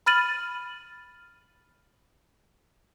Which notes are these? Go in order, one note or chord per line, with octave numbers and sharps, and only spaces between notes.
B5 F6 A6 D#7 F#7